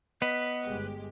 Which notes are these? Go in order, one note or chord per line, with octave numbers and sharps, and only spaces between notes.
B3 B4 D#5 B6
G1 G#3 G4